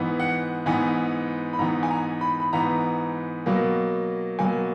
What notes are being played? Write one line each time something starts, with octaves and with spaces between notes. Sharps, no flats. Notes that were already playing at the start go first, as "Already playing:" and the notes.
Already playing: G#2 E3 B3
F#5
G#2 E3 B3 G#5
B5
G#2 E3 B3 A#5
G#5
A#5
B5
B5
G#2 E3 B3 A#5
B2 F#3 A#3
B2 F#3 A#3 G#5